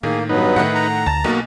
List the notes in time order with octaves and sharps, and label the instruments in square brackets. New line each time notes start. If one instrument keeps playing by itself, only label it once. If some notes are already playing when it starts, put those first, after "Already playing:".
[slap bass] A2 [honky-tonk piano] D#3 [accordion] A#3 [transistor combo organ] G#4
[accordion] G2 F#3 B3 [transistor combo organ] D#4 B4
[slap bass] A2 [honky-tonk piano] D#3 A3 F#5
[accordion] A#5
[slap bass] D2 [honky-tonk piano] A5 A6
[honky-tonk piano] B1 B2 [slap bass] A#3 [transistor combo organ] F#4 A#4